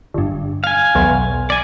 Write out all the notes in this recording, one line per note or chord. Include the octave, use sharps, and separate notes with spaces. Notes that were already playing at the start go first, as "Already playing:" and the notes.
G1 G2
F5 G#5
B1 E2
D5 G#5